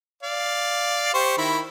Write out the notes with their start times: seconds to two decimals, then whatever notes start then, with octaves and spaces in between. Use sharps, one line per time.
0.23 D5 F5
1.14 G4 C5 C#6
1.38 D#3 E4 B5